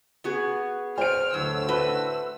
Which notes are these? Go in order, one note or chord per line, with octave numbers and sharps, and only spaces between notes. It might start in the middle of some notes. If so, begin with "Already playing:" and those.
B3 F#4 G#4
C5 F6 D7
D2 A2 D3 F#3 E6
A3 F#4 B4